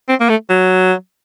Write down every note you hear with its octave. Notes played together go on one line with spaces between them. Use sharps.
C4
A#3
A3
F#3